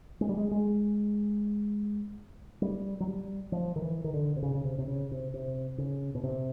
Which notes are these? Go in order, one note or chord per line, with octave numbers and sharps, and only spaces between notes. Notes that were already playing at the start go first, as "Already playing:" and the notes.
G#3
G3
G#3
G#3
G3
F#3
G3
F3
D#3
E3
D#3
D3
C3
C#3
C#3
C3
C3
C#3
C3
C3
C#3
B2
C3